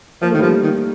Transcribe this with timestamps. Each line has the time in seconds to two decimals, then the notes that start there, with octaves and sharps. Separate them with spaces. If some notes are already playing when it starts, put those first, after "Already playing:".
0.22 F3 A#3
0.30 D#3 A3
0.39 F3 G3 A#3
0.63 D#3